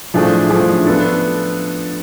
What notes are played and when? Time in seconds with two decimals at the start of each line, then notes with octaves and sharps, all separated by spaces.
0.14 A2 F3 A3 D4 G#4
0.49 A2 F3 A3 D4 G#4
0.87 F3 B3 D4 A4